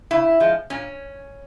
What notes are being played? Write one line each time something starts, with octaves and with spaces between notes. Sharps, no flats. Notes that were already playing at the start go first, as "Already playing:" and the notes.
C#3 E4
F3 G#3
A#2 C#4